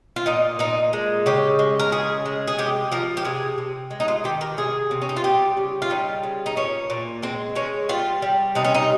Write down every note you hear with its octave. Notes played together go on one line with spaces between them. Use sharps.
F4
A#2 D#4
A#2 D#4
G#3
C#3 G4
G#3
A#4
C#3 G#4
G#3
G#4
C3 G4
F3 A#4
G4
C3 G#4
C3
G#3
D#4
F4
D#3 G4
A#4
C3 G#4
C3
C#4
D#4
F4
G3 G4
C#3
F4
G3 D#4
C#3
D#4
A#2 C#4
A#2
G#3 C4
G#3 C#4
G3 F4
G3
C3 D#4
C#4
D#4